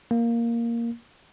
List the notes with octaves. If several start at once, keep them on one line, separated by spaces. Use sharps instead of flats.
A#3